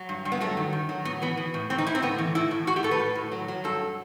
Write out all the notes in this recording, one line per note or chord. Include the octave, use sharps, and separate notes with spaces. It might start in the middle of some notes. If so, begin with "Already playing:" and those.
Already playing: F#3
G2
G2
B3
F#3 A3
D#3
D#3
F#3
A2 B3
E3 B3
E3
A2
A2 C4
D#4
A2 E4
C4
A2 B3
E3
A2 E4
A2
A2 F#4
G4
A2 A4
B4
A2
A2
F#3
F#3
G2 A4